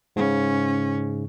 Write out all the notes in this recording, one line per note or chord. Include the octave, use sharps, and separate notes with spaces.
G#2 C#3 C#4